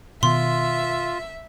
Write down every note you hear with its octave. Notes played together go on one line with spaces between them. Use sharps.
B2 D#3 B3 F4 E5 C6